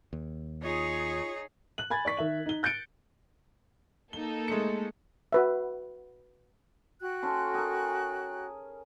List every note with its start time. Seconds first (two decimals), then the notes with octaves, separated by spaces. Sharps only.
0.13 D#2
0.63 D#4 F4 G#4 C#5
1.78 F#6 F#7
1.90 G#5 B5 G#6 A6
2.05 D5 C#6 B6
2.17 D#3 E5 F#7
2.46 D#4 G7
2.63 F#6 G6 A6 C#7 D7 G7
4.13 A#3 D#4 A4 G7
4.48 G#3 A3 C#7
5.33 F#4 B4 E5
7.01 F#4 G5 F#6
7.23 C#4 A4 C6
7.54 G#4 A#4